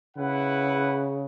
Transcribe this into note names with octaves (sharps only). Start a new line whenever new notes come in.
C#3 E4 B4 F#5